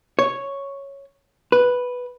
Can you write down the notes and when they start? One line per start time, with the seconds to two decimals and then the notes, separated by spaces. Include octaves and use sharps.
0.19 C#5
1.52 B4